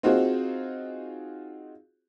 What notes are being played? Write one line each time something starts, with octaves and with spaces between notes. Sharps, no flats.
C4 D#4 F4 F#4 G#4 C5